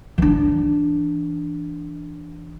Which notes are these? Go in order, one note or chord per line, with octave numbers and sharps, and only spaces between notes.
E3 D4